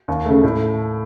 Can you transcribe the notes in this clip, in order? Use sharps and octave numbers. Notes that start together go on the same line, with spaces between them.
D#2
C#3 A3
A2